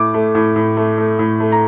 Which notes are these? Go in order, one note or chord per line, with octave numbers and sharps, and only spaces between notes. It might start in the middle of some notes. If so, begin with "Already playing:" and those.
Already playing: A2 D6
A3
A2
A2
A3
A3
A2
A3
A#5